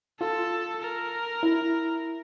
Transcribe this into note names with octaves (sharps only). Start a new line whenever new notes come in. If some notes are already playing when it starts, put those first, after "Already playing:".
F4 A4
A#4
E4